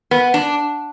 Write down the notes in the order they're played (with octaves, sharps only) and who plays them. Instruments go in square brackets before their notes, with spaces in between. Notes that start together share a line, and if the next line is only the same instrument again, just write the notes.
[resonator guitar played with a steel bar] B3
D4